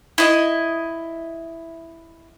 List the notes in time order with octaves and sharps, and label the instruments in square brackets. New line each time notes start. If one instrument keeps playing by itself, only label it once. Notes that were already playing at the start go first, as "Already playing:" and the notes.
[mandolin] E4 D#5